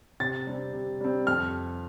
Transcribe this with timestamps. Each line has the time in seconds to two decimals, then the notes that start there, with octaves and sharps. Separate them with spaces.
0.20 C3 A6
0.47 G3 C4
0.73 C3
1.01 G3 C4
1.27 F2 F6